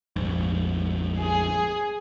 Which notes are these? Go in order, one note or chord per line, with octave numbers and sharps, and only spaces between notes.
A#1 F2 G#2
G#4